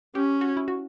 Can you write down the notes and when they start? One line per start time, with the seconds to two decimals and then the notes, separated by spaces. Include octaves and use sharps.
0.15 C#4 G4
0.41 F#4
0.57 E4
0.68 F#4